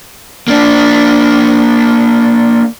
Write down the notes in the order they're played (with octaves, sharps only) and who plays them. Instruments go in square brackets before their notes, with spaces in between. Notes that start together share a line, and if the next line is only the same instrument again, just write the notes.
[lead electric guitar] A#3 D4